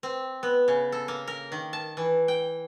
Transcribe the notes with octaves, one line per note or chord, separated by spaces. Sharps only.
C4
B3
C#3
A4
A#3
A#4
D#3
A5
E3
G5